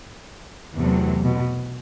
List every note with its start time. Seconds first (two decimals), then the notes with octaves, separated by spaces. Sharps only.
0.77 E2 C3 F#3 A3
1.24 B2